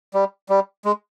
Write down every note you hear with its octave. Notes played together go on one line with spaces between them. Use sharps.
G3
G3
G#3